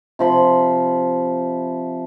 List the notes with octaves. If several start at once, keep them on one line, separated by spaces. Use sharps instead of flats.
C3 F3 B5